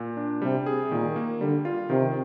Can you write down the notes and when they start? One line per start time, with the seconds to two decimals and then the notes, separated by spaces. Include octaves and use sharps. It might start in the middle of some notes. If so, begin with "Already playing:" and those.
Already playing: A#2
0.17 D4
0.42 C3 G3
0.66 G#4
0.91 A#2 D#3
1.16 A#3
1.40 D3 G3
1.65 F4
1.90 C3 D#3